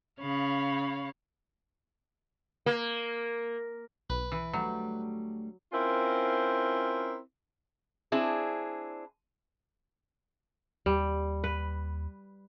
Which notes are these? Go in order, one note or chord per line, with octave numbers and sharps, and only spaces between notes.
C#3 C#5 F5 B5
A#3
B1 B4
E3
D2 F#3 G3 A3
C4 C#4 E4 F4 A#4 C5
C4 D4 E4 G#4
D#2 G3
B4